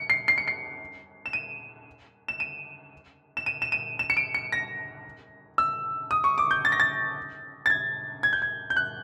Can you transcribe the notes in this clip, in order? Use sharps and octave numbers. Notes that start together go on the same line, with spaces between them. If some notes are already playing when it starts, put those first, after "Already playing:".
Already playing: C#7
C7
C7
C#7
C7
E7
D#7
E7
D#7
E7
D#7
E7
D#7
E7
C#7
D7
C#7
A#6
E6
D#6
C#6
D6
G6
A6
A#6
A6
A6
G#6
G#6
G6
G#6
G6
F#6